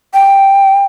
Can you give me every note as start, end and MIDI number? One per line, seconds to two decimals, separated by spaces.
0.14 0.85 79